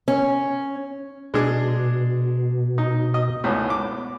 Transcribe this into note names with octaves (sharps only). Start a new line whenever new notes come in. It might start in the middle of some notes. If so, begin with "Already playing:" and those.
C#4
B2 G#3 D4 G#4
D#4
D#5
G#1 C#2 A2 B3
D6